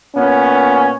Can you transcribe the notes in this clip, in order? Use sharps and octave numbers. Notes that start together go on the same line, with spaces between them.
A#2 B3 C#4